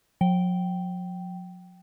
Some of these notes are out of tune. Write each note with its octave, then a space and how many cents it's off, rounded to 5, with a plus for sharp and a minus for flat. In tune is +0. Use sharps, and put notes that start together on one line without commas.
F#3 -45 G5 -10